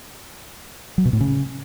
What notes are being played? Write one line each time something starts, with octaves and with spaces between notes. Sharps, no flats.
F#3
B2
A2
C#3